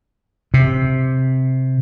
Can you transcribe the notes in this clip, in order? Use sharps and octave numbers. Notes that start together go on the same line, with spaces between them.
C3